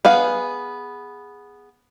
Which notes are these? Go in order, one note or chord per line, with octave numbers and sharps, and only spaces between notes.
B3 G#4 F5